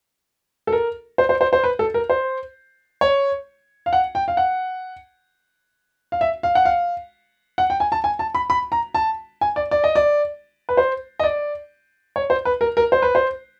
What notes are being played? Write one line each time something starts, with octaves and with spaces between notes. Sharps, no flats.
A4
A#4
C5
C5
C5
C5
B4
A4
A#4
C5
C#5
F5
F#5
G5
F5
F#5
F5
E5
F5
F#5
F5
F#5
G5
G#5
A5
G#5
A5
B5
B5
A#5
A5
G#5
D5
D5
D#5
D5
B4
C5
D#5
D5
C#5
C5
B4
A#4
A#4
C5
B4
C5